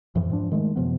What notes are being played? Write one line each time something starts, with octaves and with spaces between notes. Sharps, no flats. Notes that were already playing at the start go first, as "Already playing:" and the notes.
F2 G#2 E3 F3
G#2 F3 D4
D#3 G#3 A3
F#2 C3 F3 B3